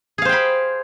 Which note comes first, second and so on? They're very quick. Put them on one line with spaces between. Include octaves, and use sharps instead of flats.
G#4 F5 C5 G5 B5